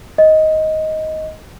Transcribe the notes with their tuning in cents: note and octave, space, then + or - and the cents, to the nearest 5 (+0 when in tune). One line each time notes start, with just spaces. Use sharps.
D#5 +10